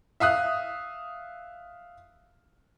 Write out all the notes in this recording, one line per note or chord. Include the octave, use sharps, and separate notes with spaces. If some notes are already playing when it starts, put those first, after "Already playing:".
E5 F5 D#6 F#6